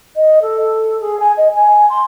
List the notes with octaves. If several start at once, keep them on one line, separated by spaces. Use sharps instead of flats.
D#5
A4
G#4
G#5
D#5
G#5
C6